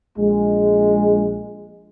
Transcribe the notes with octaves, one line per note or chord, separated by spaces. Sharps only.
A#1 G#3